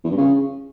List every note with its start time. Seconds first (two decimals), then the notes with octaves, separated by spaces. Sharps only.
0.04 E2
0.11 G2
0.17 C#3